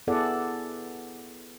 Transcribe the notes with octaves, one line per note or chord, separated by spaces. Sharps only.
B3 E4 G#4 A4 D5 F#5